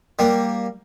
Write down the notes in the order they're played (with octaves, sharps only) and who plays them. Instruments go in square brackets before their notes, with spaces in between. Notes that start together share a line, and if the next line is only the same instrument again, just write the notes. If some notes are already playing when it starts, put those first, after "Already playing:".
[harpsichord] G3 A#3